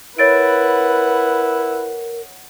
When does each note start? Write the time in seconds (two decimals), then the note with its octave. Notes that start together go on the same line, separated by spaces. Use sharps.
0.19 E4 A#4 B4 C#5 F#5 A6 D7